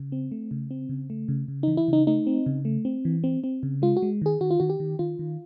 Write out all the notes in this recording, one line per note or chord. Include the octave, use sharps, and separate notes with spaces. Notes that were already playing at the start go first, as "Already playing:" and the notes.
Already playing: C#3
C4
A3
C#3
C4
C#3
A3
C#3
C#3
E3 D#4
E4
C#3 D#4
A3 D#4
C4
C#3
A3
C4
E3
C4
C4
C#3
G#3 F4
F#4
G#3
D#3 G#4
D#3 F#4
F4
D#3 F#4
G4
D#3
D#3 F4
D#3